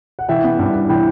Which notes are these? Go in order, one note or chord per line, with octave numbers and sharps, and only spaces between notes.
F#5
E3 E5 G5
B3
G2
G2
E3 G5 B5